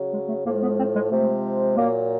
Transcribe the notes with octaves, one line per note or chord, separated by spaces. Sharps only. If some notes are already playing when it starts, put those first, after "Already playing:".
Already playing: C#3 F#3
G#3
A3
A2 F3 G#3 A#3
B3
C4
G#3
C3 F3 G#3 A3
A#2 F#3 A#3